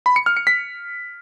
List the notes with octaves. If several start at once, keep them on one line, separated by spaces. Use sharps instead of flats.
B5
C#7
F6
C#7
B6